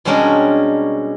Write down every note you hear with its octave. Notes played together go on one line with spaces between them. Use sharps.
B2 G3 G#3 C#4 D4 A#4